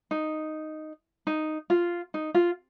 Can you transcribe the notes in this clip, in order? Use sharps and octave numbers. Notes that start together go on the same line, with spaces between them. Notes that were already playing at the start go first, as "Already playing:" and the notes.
D#4
D#4
F4
D#4
F4